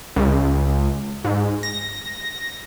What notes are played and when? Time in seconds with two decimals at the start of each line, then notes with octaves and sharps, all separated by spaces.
0.16 C#2
1.24 G#2
1.63 A#6